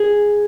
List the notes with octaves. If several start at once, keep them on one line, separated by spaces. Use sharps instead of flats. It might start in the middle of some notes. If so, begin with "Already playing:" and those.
Already playing: G#4